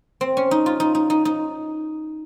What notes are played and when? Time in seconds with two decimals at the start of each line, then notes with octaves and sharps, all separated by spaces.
0.21 C4
0.37 C#4
0.51 D#4
0.66 F4
0.80 D#4
0.95 D#4
1.10 D#4
1.25 D#4